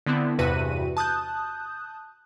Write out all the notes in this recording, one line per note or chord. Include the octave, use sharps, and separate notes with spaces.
D3 B3 C4 E4
E2 G2 C3 F#4 B4 D#7
A5 D#6 F#6 G6